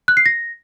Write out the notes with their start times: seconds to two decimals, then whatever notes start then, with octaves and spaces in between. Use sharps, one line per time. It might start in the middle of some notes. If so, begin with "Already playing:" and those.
0.08 F#6
0.17 C7
0.26 A#6